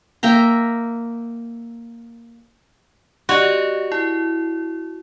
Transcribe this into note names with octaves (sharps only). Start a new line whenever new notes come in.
A#3 E5 G5 A#5
F#4 G4 D5 D#5
E4